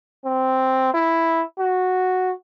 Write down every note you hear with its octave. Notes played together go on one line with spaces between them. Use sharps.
C4
E4
F#4